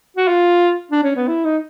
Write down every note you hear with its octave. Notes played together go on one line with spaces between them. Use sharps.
F#4
F4
D4
C#4
B3
E4
D#4